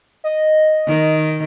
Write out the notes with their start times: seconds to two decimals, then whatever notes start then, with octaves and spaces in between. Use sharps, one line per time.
0.24 D#5
0.88 D#3